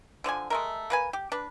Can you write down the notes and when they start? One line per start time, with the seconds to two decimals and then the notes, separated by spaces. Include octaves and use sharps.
0.24 D3 F3 D5 G#5
0.50 G#3 A3 A#4
0.90 A#3 B4 G#5
1.13 G4
1.32 D4 B4